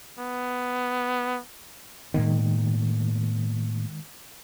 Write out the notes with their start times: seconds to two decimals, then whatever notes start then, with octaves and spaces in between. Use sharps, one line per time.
0.19 B3
2.14 A2 D#3 G#3 A#3 B3